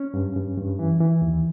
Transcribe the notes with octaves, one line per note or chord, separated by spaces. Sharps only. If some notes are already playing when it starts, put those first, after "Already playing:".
Already playing: C#4
G2
G2
G2
E3
E3
D#2